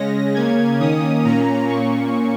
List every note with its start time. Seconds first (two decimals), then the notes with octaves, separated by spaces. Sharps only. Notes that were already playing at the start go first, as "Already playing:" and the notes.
Already playing: C#3 G#3 C#4 A#6
0.34 C#3 A#3 C#4 G#6
0.80 D#3 A#3 C#4 D#6
1.24 A#2 A#3 C#4 A#5
1.69 A#2 A#3 C#4 C#6